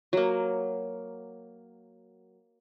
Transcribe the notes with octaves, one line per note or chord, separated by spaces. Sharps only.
F#3 A#3